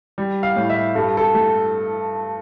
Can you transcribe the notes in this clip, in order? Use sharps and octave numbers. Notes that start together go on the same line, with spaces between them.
G3
F5
A2
E5
G2 A4
A4
A3